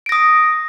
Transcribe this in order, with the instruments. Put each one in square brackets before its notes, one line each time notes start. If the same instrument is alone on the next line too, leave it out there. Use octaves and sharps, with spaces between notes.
[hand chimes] D7
A#6
D#6